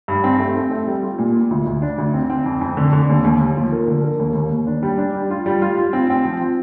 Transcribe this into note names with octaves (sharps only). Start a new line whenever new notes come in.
G2
C4
A3
C4
A3
G3
F4
A#2
F4
D2
D2
D4
D2
C4
C4
F2
F2
D3
D3
D#2
D#2
D#2
F3
A#3
D3
A#3
D#2
D#2
D#2
D4
G3
D4
G3
F4
G3
F4
F4
C4
C4
F3